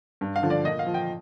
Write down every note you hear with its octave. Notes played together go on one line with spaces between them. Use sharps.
G2
F5
D3 F3
D5
A#2 D#5
F5
F3
G5